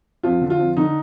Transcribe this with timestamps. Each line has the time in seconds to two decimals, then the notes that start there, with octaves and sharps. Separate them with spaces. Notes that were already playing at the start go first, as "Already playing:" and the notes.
0.23 F2 F4
0.41 D3
0.50 F4
0.59 F2
0.77 D3 D#4